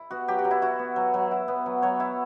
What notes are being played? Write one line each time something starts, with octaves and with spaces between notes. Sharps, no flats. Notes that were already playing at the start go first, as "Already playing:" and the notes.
Already playing: E4
B3 F#4
F#3 G4
F#4
F#3
E4
E4 F#4
B3
F#3
F#3
E4
B3
F#3
F#3 C#5
E4